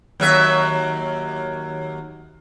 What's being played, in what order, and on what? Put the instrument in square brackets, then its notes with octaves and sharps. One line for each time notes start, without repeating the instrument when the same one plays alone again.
[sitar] D#2 F#3 E5